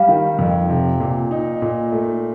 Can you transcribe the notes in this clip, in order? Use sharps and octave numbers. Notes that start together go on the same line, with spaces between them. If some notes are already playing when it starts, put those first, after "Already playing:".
Already playing: G3 F5
D#3
F2
C3
A#2
D#4
A#2
A3